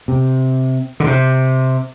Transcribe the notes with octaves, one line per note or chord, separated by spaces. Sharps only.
C3
D3
C3